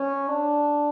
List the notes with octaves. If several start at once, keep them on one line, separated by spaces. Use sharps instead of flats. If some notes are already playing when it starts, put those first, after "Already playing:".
Already playing: C#4
D4